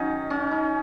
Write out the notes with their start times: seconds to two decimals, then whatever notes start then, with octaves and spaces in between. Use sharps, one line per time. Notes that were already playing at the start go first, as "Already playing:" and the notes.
Already playing: D#3 F#3 C#4 D#4
0.30 C#4
0.51 D#4